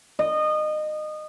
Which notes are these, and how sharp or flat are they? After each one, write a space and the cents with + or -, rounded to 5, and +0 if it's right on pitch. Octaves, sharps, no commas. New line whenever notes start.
D#5 -25